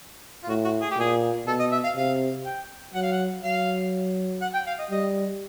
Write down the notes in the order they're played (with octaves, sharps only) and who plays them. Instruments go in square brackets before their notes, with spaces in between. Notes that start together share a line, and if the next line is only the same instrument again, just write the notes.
[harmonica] F4
[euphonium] A2 [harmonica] F#4
[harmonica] F#4
G#4
G4
[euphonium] A#2 [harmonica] G#4
[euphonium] B2 [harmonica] A4
[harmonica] D#5
E5
F5
[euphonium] C3 [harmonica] F5
[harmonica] G5
[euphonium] F#3 [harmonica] F#5
[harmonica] F5
F#5
[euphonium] F#3 [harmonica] F5
[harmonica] F#5
G5
F5
D#5
[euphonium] G3 [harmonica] D#5